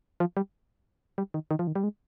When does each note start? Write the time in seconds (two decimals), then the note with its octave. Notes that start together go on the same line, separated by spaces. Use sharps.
0.20 F3
0.37 G3
1.18 G3
1.34 D#3
1.51 D#3
1.59 F3
1.67 D#3
1.75 G3
1.84 G#3